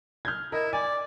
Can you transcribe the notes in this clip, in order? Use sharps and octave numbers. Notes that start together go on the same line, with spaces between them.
F6 G6 G#6
E4 A#4 D#5
D5 G#5